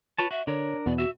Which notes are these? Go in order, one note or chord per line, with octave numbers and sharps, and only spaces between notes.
F4 B4 C#5 A5
F#4 E5
D3 D4 A#4 C#5
E2 B2 B3 D5
F#4 E5